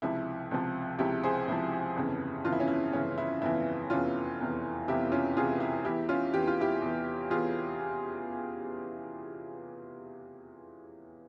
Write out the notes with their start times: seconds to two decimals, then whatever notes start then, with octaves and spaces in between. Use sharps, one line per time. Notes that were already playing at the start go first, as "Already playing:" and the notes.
0.02 C#2 C3 F3 E4
0.51 C#2 C3 F3
0.99 C#2 C3 F3 E4 G4
1.23 G#4 C5
1.48 C#2 C3 F3 E4
1.96 G1 F2 C#3 E3
2.44 G1 F2 C#3 E3 F4
2.53 E4
2.60 C#4
2.68 E4
2.93 G1 F2 C#3 E3 C#4
3.18 E4
3.42 G1 F2 C#3 E3 E4
3.90 F1 E2 C3 E3 C#4 F4
4.40 F1 E2 C3 E3
4.88 F1 E2 C3 E3 E4 G4
5.12 C#4 F4
5.36 F1 E2 C3 E3 F4 G#4
5.60 E4
5.85 E2 E3 E4 G4
6.09 C#4 F4
6.33 E2 E3 G4
6.47 F4
6.60 E4 G4
6.82 E2 E3
7.30 E2 E3 F4 G#4